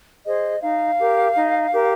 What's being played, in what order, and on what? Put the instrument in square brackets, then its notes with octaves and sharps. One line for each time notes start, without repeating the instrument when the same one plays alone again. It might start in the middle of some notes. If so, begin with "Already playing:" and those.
[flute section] G#4 C5 D#5
D#4 F5
G4 A#4
D#4
G4 A#4